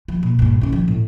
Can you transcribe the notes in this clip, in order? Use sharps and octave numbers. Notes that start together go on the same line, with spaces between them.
F3
A#2
G2 A#2
D#3 C#4
F3
A2